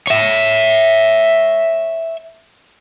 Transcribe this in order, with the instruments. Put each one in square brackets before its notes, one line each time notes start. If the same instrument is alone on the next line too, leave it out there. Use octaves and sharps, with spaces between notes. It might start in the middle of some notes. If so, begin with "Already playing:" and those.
[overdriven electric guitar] C#5 E5